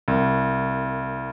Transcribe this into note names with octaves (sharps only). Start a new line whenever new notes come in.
C2